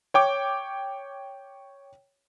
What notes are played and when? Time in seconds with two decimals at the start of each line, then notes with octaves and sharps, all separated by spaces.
0.14 C#5 G5 D6